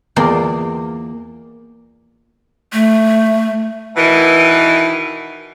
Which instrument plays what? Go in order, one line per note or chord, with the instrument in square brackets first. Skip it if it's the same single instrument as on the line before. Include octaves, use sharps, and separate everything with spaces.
[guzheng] E2 A#3 F4 D5 G5
[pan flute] A3
[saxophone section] B2 D#3 E3